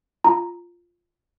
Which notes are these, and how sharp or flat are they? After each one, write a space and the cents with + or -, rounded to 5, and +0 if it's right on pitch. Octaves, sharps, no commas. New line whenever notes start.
F4 +0 A#5 +0